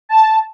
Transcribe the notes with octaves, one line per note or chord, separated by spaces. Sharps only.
A5